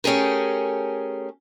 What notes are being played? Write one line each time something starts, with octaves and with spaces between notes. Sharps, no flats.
A3 C#4 G4 G#4 A#4